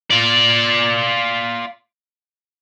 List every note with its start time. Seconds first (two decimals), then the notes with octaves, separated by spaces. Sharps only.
0.11 F4 D5